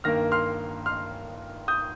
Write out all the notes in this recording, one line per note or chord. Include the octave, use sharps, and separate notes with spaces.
G2 D#3 A#3 F6 A#6
C6 F6
C6 F6
D#6 G6